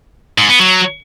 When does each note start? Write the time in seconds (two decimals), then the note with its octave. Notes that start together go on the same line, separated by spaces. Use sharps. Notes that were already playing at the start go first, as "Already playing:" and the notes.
0.38 G#2
0.49 B3
0.60 F#3